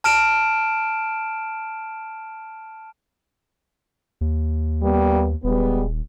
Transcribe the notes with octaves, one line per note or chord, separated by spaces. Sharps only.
A5 F6 D7 E7
D#2
G3 A#3 B3
D#1 G3 G#3 B3